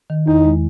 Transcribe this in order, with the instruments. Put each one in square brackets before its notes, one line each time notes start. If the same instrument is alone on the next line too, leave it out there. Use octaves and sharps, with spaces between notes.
[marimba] D#3
[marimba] E2 [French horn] D#4
[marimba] G#3